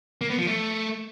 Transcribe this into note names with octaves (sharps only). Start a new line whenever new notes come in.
A#3
B3
F3
A3